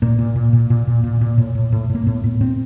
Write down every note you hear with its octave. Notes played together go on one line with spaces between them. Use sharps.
A#2 A#3
A#2
A#2
A#2
A#2
A#2
A#2
A#2
A2
A2
A2
A2
A#3
A2 B3
A2
A2 C4